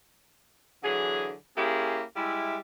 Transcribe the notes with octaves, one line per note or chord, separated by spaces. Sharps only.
D3 E3 F#3 G#4
A#3 C#4 E4 G4 G#4
G3 G#3 E4